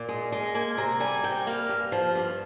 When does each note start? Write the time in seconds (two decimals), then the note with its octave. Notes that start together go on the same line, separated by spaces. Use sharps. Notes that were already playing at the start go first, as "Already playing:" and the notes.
Already playing: A#2
0.09 G#3
0.32 G#3
0.55 A#3 G#5
0.77 C3 A#5
1.00 G3 G#5
1.23 C3 G5
1.47 A#3 F5
1.69 G2
1.92 F3
2.15 G2